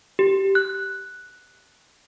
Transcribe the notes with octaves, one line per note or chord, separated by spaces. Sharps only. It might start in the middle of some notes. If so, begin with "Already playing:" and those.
G4
F#6